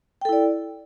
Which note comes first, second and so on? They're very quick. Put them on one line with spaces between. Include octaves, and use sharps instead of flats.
G5 A4 E4 D5